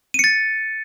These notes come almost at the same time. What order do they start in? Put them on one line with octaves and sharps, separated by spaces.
D#7 C#7 A6